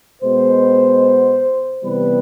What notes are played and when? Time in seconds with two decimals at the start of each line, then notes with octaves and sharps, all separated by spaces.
0.22 B2 G#3 B3 C5
1.83 C3 E3 G3 B3 B4